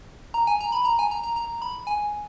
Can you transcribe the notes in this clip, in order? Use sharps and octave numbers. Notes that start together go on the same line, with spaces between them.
A#5
G#5
A#5
B5
A#5
G#5
A#5
A#5
A#5
B5
G#5